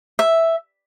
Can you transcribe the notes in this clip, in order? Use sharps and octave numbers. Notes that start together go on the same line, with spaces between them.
E5